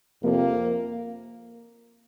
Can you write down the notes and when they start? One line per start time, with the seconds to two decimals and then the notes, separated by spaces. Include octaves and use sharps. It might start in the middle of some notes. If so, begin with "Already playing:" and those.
0.22 F2 C3 F3 A#3